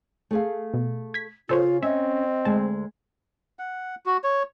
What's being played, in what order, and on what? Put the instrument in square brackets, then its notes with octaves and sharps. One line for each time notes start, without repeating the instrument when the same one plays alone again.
[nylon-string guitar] A3 G#4 F5
[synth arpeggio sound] B2
G#6 B6
[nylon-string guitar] C#3 [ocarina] F4 [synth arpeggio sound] A4 C5 C#5
[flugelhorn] C4 [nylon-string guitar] C#4 [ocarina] D#5 [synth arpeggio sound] E5
[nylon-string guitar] D2 G#3 [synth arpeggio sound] A5
[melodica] F#5
F#4
C#5